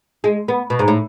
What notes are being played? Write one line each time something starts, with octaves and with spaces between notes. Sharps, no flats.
G#3
B3
B2
G#2
A2